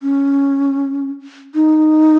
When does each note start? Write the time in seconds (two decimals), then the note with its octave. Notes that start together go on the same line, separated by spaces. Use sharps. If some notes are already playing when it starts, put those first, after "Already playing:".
0.03 C#4
1.54 D#4